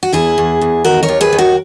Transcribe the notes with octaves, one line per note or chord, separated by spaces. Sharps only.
F#4
E2 E4 G#4
E2
E2
D#3 F#4 A#4
A#4 C#5
D#2
G#4 B4
D#3
F#4 A#4